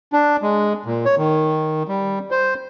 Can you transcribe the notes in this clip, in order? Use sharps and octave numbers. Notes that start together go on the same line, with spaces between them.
D4
G#3
A#2
C#5
D#3
G3
C5